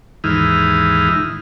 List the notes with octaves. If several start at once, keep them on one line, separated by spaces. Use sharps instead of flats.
D#2 G#2 E3 D#4 E4 F6